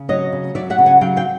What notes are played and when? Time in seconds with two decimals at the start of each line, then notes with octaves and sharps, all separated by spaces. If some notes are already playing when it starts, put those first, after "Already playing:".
Already playing: C#3
0.09 F#3 C#5 D#5
0.32 C#3
0.55 F#3 D5 E5
0.70 E5 F#5
0.78 C#3
0.86 F#5 G#5
1.01 F#3 F5 G5
1.16 F5 G5